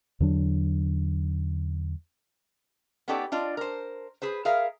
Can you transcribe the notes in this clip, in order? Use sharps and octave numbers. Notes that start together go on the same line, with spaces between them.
E2 D3 F#3 D4
B3 C#4 D#4 G4 A4 D5
D4 F4 D5 D#5
A#4 C5
G#4 B4 C5
G#4 A#4 E5 F5